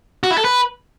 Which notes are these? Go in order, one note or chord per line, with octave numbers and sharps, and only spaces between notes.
F#4
E4
A4
B4